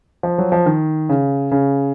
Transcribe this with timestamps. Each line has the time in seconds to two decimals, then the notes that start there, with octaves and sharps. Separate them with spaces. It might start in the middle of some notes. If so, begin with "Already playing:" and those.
0.23 F3
0.38 F#3
0.52 F3
0.66 D#3
1.09 C#3
1.51 C#3